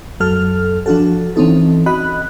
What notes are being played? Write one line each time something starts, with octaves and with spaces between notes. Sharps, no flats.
F#2 F#3 A4 F6
F3 D4 F#4 A4
E3 C4 C#4 D#4 A4
F#4 D#5 B5 F#6